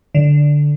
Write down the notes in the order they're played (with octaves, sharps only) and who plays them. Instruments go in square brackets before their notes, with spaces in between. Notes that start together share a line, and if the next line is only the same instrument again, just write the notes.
[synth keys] D3